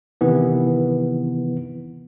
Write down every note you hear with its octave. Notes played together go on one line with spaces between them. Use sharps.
C3 D#3 E3 B3